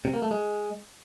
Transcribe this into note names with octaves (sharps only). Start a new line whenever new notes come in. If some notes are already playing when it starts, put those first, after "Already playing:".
C3
A#3
A3
G#3